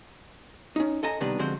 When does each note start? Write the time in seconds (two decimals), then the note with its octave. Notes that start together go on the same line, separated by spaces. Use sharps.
0.76 C#4 D#4
1.03 A4 D#5 G#5 A#5
1.20 C3 D#3 G3 B3 D4
1.39 D3 F3 G#3 C4 F#4 C5